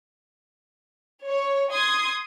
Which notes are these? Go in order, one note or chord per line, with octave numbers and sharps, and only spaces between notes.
C#5
C6 D#6 G#6 C7